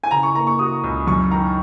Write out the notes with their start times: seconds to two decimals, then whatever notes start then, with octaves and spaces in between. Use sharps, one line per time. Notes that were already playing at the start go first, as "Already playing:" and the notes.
0.04 G#5
0.11 C#3 A#5
0.23 C#6
0.35 A#3 A#5
0.47 C#6
0.59 F#4 D#6
0.84 C#2
1.07 F#2 C#6
1.31 D#3 A#5